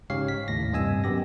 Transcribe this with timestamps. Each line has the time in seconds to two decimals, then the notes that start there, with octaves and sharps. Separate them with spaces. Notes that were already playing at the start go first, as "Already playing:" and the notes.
0.10 G#2 C#3 G4 C#5 F5 C7
0.28 B6
0.48 D#2 A2 A#6
0.72 G2 C3 D#5 G#5 E6
1.04 F#2 B3 G4 A#6